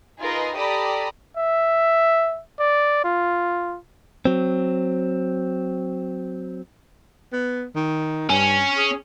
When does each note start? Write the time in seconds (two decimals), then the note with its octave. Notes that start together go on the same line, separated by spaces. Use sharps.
0.19 D#4 F4 G#4 A#4 B4 D#5
0.54 G4 A4 D5 A#5 B5 D#6
1.37 E5
2.59 D5
3.04 F4
4.25 F#3 C4
7.32 B3
7.75 D#3
8.29 G2 C#4
8.77 G#4